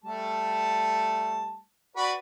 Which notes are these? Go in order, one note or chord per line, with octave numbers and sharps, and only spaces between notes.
G3 A3 A5
F#4 B4 D5